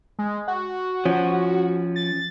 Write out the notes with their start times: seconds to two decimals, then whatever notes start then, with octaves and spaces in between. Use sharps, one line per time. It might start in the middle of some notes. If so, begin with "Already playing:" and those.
0.19 G#3
0.48 F#4
1.05 F3 C#4
1.96 A6